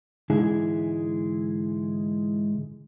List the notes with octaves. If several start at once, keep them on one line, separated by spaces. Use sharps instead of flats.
G#2 D3 E3 G#3 E4 G#4